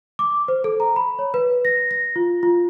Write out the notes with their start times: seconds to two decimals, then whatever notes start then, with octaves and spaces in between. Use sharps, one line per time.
0.19 D6
0.48 C5
0.64 A4
0.80 A#5
0.96 B5
1.19 C#5
1.34 B4
1.65 A#6
1.91 A#6
2.16 F4
2.43 F4